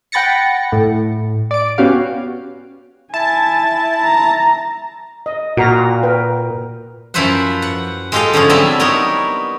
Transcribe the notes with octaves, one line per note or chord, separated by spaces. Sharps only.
F#5 G5 B5 A6 A#6 C#7
A2
D5 D7
B3 C#4 F#4 G4 F5
E4 G#5 A5
A#5
D#5
A#2 F#4 A#4 A#5
A#4 B4 G5
F#2 F3 E4 B4 C5 F#5
F#5
G#3 F4 G4 A4 D#5 F5
D3 F3 C#4 G#4
F#3 G3 B3 C4 D4 E4
B3 D#4 E4 A#4 C#5